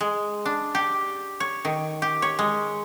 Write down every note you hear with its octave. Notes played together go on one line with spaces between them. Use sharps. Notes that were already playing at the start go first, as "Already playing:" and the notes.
G#3
D4
G4
C#5
D#3
G4
C#5
G#3